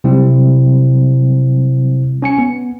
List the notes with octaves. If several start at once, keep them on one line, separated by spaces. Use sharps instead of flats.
C3 F#3 G3 C4 E4
C#4 G#5 C#7
B3